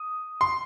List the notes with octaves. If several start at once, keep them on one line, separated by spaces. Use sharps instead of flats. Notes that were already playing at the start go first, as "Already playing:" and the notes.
Already playing: D#6
C6